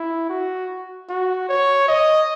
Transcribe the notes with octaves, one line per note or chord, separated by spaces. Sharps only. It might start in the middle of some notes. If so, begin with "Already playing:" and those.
Already playing: E4
F#4
F#4
C#5
D#5